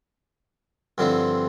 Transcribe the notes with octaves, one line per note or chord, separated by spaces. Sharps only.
G2 D3 F3 C4 E4